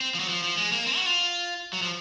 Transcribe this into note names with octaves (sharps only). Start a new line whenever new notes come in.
C4
F3
F#3
F3
F3
G#3
A#3
C4
F#4
F4
F#3
F3